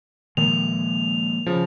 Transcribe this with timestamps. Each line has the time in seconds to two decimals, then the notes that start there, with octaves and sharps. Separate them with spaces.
0.37 A#2 D#3 F3 G#3 F7
1.46 C#3 F3